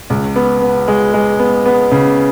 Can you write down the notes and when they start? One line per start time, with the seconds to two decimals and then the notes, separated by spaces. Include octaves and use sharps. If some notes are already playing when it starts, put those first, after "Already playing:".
0.10 C#2
0.36 B3
0.62 B3
0.88 G#3
1.14 G#3
1.39 B3
1.66 B3
1.91 C#3